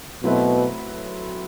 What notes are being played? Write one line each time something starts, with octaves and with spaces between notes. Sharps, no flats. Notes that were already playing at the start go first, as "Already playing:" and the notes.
B2 F#3 A3 C4 E4 B4